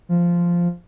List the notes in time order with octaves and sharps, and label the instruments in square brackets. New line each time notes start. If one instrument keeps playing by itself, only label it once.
[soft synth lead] F3